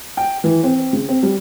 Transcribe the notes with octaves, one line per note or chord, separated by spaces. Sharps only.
G5
E3
C4
C#3
C4
G3